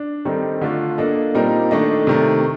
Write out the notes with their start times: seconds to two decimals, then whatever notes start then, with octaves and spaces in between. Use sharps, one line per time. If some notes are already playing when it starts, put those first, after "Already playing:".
Already playing: D4
0.25 D#3 G3 C4 D#4 A4
0.61 D3 A3 D4 F4
0.98 A#3 D4 A4 D#5
1.34 A#2 G3 C4 D#4 A#4
1.71 D#3 A3 D4 A4 D#5
2.07 C3 D#3 A3